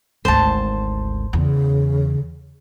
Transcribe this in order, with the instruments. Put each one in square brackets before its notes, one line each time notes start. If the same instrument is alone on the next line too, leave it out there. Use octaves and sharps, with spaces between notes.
[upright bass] G#1 D2 [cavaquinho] C5 A5
[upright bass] E2 [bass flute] C#3